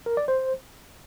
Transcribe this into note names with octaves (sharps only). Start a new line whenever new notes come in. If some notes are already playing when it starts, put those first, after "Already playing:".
A#4
D5
C5